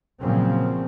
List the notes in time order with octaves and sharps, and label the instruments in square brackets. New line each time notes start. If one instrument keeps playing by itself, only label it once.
[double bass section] A#2 C#3 F3 F#3 C4